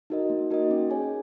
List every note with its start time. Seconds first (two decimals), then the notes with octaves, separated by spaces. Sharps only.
0.10 D#4 F#4 A#4 D#5
0.30 A#3
0.50 D#4 F#4 A#4 D#5
0.71 C#4
0.90 G#4 C#5 G#5